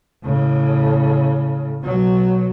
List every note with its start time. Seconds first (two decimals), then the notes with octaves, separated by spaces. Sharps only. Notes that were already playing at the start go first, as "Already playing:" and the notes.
0.24 A2 C#3
1.82 B2 F#3